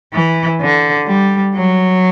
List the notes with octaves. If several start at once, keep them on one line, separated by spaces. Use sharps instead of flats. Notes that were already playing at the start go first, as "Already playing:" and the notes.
E3
D3
G3
F#3